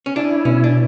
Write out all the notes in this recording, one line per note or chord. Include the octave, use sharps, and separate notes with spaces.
C#4
D4 E4
B2 C#4
D4